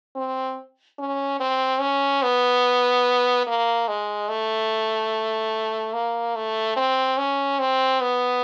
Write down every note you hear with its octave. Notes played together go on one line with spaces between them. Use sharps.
C4
C#4
C4
C#4
B3
A#3
G#3
A3
A#3
A3
C4
C#4
C4
B3